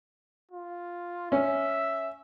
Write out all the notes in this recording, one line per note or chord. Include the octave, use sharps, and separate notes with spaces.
F4
C#4 E5